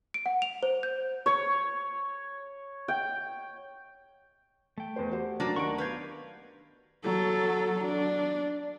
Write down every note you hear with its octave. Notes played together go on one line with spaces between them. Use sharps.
D7
F#5
F7
C5
G6
C#5
G5
A3 G5
E2 C5
F#4 G4 C5
F#2 F#3 A#3 D4
D#2 D#4 F#5 C#6 D7
B3 A#4 B4 F5 G6 G#6
F#3 A4
D4